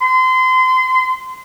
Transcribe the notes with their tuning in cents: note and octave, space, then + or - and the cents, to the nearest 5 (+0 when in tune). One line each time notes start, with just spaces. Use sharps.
C6 -30